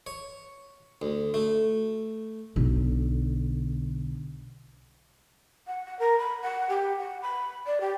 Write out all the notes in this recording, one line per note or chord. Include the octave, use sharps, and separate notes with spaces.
C#5
D2
A3
B1 D3
F#5
F#5
A#4
B5
F#5
G4
F#5
B5
D5
G4